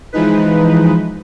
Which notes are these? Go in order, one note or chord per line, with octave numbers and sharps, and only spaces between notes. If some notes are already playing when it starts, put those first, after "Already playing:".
E3 F3 G#3 D#4 B4